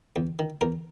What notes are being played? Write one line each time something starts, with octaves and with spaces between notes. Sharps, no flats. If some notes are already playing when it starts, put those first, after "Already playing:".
E2
D#3
E2 A#4